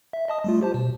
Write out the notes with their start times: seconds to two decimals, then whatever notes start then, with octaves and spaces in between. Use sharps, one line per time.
0.13 E5
0.28 D#5 A5 D#6
0.44 G3 A3 F4
0.61 G4 C5 A5
0.74 B2